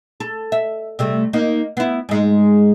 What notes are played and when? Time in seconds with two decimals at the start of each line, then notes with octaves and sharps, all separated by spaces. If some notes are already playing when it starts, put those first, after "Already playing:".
0.20 A4
0.52 E5
0.99 C3 G3 A3
1.33 A#3 D#4
1.77 B3 E4
2.09 G#2 G#3